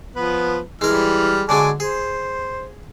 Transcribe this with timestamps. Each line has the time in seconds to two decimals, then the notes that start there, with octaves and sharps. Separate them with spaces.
0.16 F3 B3 B4
0.81 E3 G3 G#3 A#4 F6
1.49 D3 F#3 G#3 G#5 A5 D6
1.80 G#4 C5